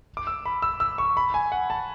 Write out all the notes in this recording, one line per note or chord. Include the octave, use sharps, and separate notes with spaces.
D6
E6
B5
E6
E6
C#6
B5
G#5
F#5
A5